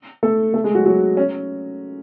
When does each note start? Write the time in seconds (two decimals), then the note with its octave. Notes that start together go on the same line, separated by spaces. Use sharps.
0.23 A3 A4
0.54 A3 A4
0.64 G#3 G#4
0.75 F#3 F#4
0.85 F#3 F#4
1.17 C#4